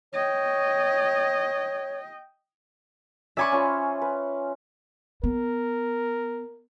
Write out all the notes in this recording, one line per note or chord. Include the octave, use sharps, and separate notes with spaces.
C#5 D#5 G5
C#4 D5 E5 G#5 B5 C#6
C#4 F4 C5
B4
B3 A#4